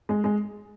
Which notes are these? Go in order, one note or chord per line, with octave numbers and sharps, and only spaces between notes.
G#3
G#3